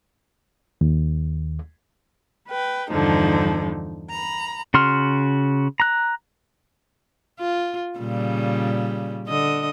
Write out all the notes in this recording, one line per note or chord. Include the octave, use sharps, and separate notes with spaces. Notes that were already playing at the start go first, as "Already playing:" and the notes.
D#2
B4 G5
E2 G2 D3 F3 D#4
A#5 B5
C#3 F#4 C6 F6
A#5 F#6
F4
A#2 C#3 G3
D3 D#5